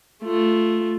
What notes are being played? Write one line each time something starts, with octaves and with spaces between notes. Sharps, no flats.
A3 F4